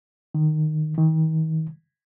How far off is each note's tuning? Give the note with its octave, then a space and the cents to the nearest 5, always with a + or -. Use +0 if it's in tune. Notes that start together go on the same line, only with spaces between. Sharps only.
D#3 -15
D#3 +35